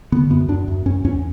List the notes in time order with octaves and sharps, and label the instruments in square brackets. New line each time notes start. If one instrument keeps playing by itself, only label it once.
[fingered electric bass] D3 B3
F#2 B3
F#2 D4
F#2
F#2 C#4
E2 C#4